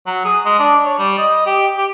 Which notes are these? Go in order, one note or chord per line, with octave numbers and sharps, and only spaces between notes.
F#3
G#4
G#3
D4
C#5
G3
D#5
G4
G4